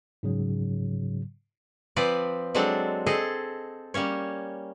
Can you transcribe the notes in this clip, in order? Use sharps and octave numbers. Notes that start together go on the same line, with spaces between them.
G#2 C#3 F#3
F3 C4 B4 D5
F#3 G#3 C4 D4 A4
C4 G#4 A4 D#5
G3 A#3 C#4 C#5